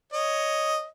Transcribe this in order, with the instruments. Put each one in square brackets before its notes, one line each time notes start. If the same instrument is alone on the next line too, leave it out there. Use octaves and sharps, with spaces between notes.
[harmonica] C#5 D#5